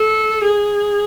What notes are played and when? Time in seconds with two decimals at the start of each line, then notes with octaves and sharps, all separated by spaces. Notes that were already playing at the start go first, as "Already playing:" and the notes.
Already playing: A4
0.44 G#4